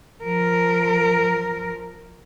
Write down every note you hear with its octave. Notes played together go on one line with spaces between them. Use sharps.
F3 A#4